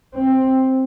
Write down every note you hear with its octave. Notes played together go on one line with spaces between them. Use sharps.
C4